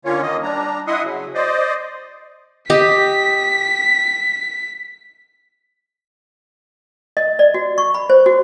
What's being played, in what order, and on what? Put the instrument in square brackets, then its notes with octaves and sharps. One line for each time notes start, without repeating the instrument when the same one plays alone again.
[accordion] D3 A#3 C#4 F4 C#5
D#3 A#3 D#5
G3 D4 A#5
E4 D#5 E5 F#5 C6 D#6
C#3 F#3
C5 D5 D#5
[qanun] G4 D#5 [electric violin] B6
[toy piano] D#5
D5
F#4
C#6
B5
C5
F#4